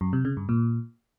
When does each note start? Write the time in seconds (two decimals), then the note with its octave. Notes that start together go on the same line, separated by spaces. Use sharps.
0.01 F#2
0.13 C3
0.25 C#3
0.37 G2
0.49 A#2